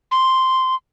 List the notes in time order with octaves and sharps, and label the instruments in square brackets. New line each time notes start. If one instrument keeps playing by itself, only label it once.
[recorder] C6